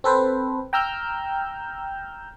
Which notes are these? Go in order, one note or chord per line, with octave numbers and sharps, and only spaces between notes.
C4 A4 B4 C5
G5 A#5 E6 F6 G6